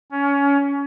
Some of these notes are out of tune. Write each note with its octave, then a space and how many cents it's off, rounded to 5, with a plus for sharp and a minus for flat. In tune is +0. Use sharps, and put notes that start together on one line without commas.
C#4 +25